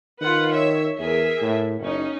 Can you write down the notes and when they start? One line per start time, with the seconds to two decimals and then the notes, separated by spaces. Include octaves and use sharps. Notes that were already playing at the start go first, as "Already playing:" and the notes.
0.21 D#3 F4 B4 F#5
0.52 C#5 E5
0.99 E2 G#4 A#4 E5
1.42 A2
1.80 F#1 C#4 D#4